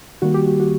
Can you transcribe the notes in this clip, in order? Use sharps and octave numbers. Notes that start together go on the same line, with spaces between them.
D#3 G3 A#3 F#4
G4
F#4
F#4